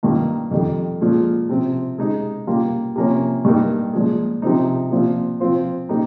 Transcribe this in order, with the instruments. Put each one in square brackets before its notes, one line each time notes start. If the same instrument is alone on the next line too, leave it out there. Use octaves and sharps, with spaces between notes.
[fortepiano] G2 D#3 A#3 F4
F2 D#3 G3
A#2 F3 G#3
C3 F3 C4
G#3 D#4 G4
G3 A#3 F4
C3 F3 A#3 C#4
G2 G3 A#3 D#4 A#4
A#2 F3 G#3
C3 F3 C4 D#4
A#2 F3 C4 F4
F3 C4 F4 C5
G3 A#3 D#4